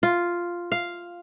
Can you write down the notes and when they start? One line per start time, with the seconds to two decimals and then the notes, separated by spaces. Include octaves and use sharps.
0.03 F4
0.72 F5